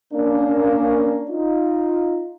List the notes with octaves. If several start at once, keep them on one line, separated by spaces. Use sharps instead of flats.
A#3 C#4 D4
D#4 F4